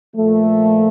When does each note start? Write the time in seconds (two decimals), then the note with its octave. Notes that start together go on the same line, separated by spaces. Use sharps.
0.15 A#2 F3 A3